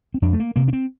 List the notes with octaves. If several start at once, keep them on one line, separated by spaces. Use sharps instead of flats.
C4
F2 D4
A3
A#3
C3 A#3
D4
C4